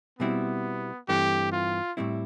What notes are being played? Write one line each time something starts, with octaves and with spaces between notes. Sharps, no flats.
B2 G3 B3 C4 E4
G2 E3 A3 C4 G4
F4
A2 G3 C4 E4